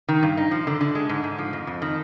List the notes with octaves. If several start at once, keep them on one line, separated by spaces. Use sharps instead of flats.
D#3
G2
D#4
F3
D3
D3
G#3
G#2
G#2
F3
F2
F2
D#3